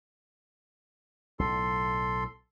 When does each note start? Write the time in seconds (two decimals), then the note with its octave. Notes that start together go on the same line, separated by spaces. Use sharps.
1.39 B1 A2 A4 C6